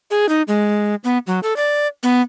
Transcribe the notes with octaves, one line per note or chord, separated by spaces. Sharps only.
G#4
D#4
G#3
B3
F#3
A4
D5
B3